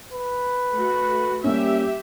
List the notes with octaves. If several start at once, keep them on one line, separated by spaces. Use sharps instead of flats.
B4
A3 F#4
G3 A#3 C#4 G4 E5